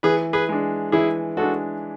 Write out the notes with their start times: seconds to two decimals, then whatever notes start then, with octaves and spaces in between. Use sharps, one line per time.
0.03 E3 G#4 B4
0.33 G#4 B4
0.49 G#3 D4
0.92 E3 E4 G#4
1.37 G#3 D4 F#4 A4